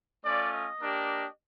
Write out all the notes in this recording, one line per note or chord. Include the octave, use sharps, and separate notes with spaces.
A3 C#4 F4 D5
D#5
A#3 D4 G4